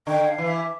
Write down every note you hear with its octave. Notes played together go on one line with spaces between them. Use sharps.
D3 G5
F5
E3
E5